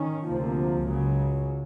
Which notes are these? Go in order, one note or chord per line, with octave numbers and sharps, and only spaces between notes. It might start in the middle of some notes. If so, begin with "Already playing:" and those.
Already playing: D#3 C#4
D2 C3 F3 A#3
C#2 C#3 F#3